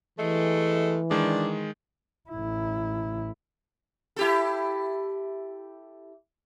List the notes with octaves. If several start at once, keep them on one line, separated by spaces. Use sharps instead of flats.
C3 E3 G#3 A3
D#3 G#3 D4
A1 E4
E4 G4 A4